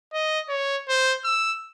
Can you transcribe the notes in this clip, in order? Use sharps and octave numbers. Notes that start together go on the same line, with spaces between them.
D#5
C#5
C5
E6